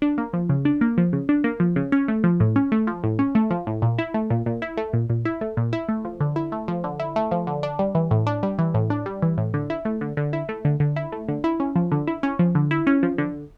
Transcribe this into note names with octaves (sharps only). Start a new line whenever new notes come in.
D4
A#3
F3
C#3
D4
A#3
F3
C#3
D4
A#3
F3
C#3
C#4
A3
F3
A2
C#4
A3
F3
A2
C#4
A3
F3
A2
A#2
E4
A3
A#2
A#2
E4
A3
A#2
A#2
E4
A3
A#2
E4
A3
F3
D3
E4
A3
F3
D3
E4
A3
F3
D3
D4
G3
E3
A2
D4
G3
E3
A2
D4
G3
E3
A2
D3
E4
A3
D3
D3
E4
A3
D3
D3
E4
A3
D3
E4
C#4
F3
D3
E4
C#4
F3
D3
E4
C#4
F3
D3